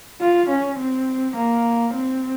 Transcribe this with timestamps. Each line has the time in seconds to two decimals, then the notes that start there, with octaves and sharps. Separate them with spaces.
0.21 F4
0.50 C#4
0.79 C4
1.36 A#3
1.94 C4